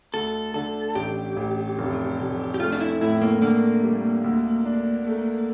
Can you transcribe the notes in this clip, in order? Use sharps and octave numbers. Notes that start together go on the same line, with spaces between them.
D2 A4
D3 A4
A1 G4
A1
F1
F1
G4
A3 F4
D4
E4
A2 E4
A#3
D3 A#3
G3
D2
D4
A3